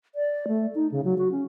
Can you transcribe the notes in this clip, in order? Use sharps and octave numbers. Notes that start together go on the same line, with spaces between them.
D5
A3
D#4
C#3
F#3
F#4
C#4